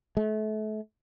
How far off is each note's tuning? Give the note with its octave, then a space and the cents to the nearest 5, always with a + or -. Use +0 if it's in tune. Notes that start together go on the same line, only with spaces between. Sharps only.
A3 -35